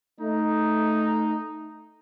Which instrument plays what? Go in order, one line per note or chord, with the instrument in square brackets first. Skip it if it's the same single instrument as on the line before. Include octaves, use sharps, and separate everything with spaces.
[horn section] A3 D#4